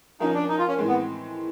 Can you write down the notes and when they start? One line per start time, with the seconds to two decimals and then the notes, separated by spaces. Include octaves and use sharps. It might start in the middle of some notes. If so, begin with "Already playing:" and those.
0.20 F3 A#3 C#4 D#4
0.34 D4
0.49 D#4
0.59 F4
0.68 C#4
0.78 A2 E3 G#3 C4
0.88 B3